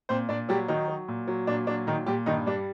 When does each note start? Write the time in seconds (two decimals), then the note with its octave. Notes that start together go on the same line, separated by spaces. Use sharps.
0.09 A#2 C4 C5
0.29 A#2 D4 D5
0.49 F#3 G3 G4
0.68 D#3 F#3 D#4
0.88 F#3
1.08 A#2
1.27 F#3
1.47 A#2 D4
1.67 F#3 D4
1.87 A#2 D#3 D#4
2.06 A#2 G3 G4
2.26 G2 D#3 D#4
2.46 G3 D4